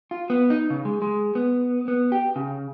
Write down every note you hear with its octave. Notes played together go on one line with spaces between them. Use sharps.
F4
B3
D#4
C#3
G#3
G#3
B3
B3
G4
C#3